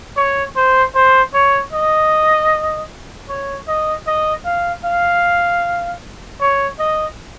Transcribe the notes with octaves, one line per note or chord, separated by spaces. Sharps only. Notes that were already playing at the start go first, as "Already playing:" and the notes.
C#5
C5
C5
C#5
D#5
C#5
D#5
D#5
F5
F5
C#5
D#5